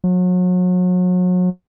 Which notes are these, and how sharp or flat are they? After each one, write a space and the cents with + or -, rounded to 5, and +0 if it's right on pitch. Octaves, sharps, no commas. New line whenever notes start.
F#3 -35